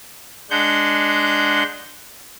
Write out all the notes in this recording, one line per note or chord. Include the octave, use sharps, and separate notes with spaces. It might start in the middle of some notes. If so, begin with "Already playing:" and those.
G#3 D4 F#5 G6